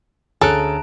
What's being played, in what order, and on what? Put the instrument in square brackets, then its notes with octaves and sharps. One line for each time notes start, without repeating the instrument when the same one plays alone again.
[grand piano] D2 G#4 F#6 [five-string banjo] C#4 A4 [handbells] A5 A#5 D7